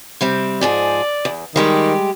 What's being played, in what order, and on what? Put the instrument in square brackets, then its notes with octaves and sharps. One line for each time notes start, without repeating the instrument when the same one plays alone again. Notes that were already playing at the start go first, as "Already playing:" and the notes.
[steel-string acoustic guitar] C3 G3 C4
[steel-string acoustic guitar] G#2 F3 G#4 [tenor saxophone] D5
[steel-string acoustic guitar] E2
[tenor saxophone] D#3 [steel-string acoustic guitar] G3 G#3 G4